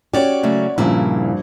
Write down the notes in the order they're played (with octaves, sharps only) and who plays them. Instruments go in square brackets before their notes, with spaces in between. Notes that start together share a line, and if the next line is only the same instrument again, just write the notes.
[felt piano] C#4 C#5 [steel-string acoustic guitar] F#4 D5 [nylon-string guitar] G4
[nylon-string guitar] C#3 F#3 A3
[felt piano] A#1 G2 [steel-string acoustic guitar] A#2 A#3 E4 [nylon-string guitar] C#3